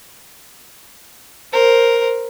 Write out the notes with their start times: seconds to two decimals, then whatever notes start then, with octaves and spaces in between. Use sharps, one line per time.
1.53 A#4 C5